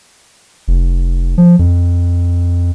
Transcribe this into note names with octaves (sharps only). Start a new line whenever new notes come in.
F1
F3
F2